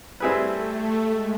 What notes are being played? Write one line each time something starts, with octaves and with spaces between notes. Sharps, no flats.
G3 A3 C4 E4 G#4 B4
G#3